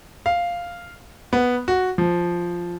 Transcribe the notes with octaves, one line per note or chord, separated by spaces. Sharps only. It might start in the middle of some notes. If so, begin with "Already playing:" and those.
F5
B3
F#4
F3